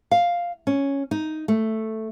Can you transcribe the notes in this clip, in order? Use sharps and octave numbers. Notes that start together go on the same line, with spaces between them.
F5
C#4
D#4
A3